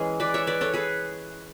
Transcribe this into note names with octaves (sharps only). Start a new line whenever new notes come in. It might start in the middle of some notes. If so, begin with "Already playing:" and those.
Already playing: E3 G#3 C#4 G#4
B4 D5
C#5 E5
B4 D5
A4 C#5
G#4 B4